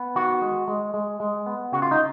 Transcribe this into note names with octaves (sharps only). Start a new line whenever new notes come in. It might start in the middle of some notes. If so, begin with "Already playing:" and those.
Already playing: B3
D#3 F#4
G#3
G#3
G#3
G#3
B3
C#3 F#4
F4
D#4